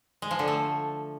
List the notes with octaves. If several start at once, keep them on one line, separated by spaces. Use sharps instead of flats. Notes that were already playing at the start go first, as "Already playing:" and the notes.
G#3
F3
D3
A3